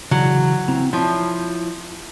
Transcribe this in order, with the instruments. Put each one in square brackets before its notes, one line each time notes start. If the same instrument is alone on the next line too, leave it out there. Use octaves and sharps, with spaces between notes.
[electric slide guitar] C#3 E3 F#4 [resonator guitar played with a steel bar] F#3
[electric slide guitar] C4 E4 A#5
[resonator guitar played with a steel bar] F3 [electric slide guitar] E4 C#5 E5